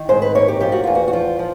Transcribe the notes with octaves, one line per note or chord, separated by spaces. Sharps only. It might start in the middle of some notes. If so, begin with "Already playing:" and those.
Already playing: D#3
G#2 C5
B4
A#3 C#5
G4
F3 G4
F#4
E2 F4
F#4
F#4
F3 F4
F3